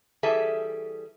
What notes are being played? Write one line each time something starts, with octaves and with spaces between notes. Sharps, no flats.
E3 G3 G#4 A4 E5 A5